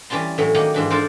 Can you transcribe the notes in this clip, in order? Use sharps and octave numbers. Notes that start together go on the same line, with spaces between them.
E3 G3 C#4 A5 C6
A2 E3 F#3
D#3 F#3 A#3 D#4 G4 G#4
G#2 E3 D4
D4 F4 A4 A#4 C5